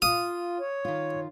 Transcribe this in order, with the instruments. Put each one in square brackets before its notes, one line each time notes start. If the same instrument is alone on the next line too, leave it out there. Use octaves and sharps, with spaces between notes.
[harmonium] F4 [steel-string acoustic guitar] F5 [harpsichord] D#6
[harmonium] C#5
[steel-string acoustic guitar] D#3 F4